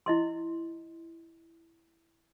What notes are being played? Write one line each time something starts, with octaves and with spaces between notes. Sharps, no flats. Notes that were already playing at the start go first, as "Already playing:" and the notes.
E4 D#5 C6